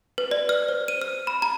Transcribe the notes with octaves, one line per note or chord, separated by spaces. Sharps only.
B4
D5
F6
C5
D#7
F6
B5
A#5